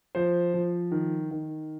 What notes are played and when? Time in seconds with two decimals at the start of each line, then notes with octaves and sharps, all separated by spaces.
0.15 F3 C5
0.54 F3
0.92 D#3
1.31 D#3